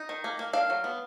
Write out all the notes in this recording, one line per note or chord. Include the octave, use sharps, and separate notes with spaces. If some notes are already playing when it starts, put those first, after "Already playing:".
Already playing: D#4
D#3
A#3
A#3
D4 F5
F#3
B3